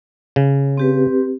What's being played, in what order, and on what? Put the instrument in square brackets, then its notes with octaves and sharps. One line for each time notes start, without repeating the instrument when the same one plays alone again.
[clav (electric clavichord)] C#3
[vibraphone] C4 G4 B4